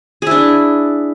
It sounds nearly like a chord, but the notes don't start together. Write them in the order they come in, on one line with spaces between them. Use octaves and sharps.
G#4 E4 D4